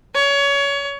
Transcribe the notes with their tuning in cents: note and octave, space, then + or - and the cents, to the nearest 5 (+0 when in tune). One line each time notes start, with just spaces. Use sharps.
C#5 +25